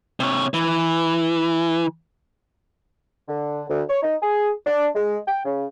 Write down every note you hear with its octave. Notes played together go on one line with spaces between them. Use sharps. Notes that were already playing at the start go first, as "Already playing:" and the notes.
C3 C#5
E3
D3
D2
C#5
D#4
G#4
D4
G#3
G5
C#3